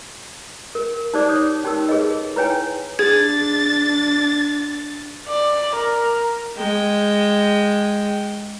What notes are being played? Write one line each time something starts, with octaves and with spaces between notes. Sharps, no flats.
A#4
D#4 G4 C5 D5 D6
C#5 D#6
C#4 D#4 G4 A#4 E6
G#4 B4 C#5 D#5
E4 B4 C#5 G5 G#5
D4 G#4 G#6 A6
D5
A#4
G#3 G5